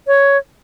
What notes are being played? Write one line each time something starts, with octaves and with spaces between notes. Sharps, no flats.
C#5